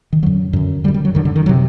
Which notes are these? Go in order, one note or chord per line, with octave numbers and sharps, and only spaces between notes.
D#3
F#2 D3 F#3
F#2 D3
F#2 D3 G3
G3
F#3
F#2 D3 D#3
D3
D#3
F#3
C3